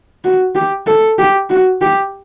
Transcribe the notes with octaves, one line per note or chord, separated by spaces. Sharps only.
F#4
G4
A4
G4
F#4
G4